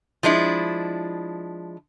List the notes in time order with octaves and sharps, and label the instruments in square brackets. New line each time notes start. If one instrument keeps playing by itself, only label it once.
[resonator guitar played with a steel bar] F3 G#3 D4 E4